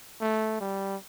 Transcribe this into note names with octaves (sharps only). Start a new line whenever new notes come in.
A3
G3